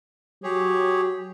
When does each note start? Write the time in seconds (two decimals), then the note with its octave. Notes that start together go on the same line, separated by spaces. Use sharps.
0.44 F#3 G4 G#4 C#5